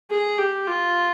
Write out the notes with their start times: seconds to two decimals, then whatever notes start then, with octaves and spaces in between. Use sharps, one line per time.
0.10 G#4
0.38 G4
0.67 F4